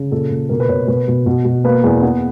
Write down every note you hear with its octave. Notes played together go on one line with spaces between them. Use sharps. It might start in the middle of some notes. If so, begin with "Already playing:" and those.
Already playing: C#3
A#2 A4
A#2
B2 A#4
B4
B2 C#5
B2 B4
B2
B2
B2
A#3 B4
E2
B3